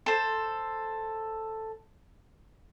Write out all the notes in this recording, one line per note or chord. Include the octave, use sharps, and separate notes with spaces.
A4 C5